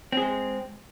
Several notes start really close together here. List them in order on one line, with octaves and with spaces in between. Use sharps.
C4 G#4 G#3